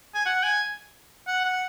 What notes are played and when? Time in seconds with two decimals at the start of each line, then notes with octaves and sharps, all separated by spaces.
0.15 G#5
0.26 F#5
0.44 G#5
1.28 F#5
1.45 F#5